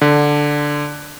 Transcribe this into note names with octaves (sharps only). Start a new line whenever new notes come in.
D3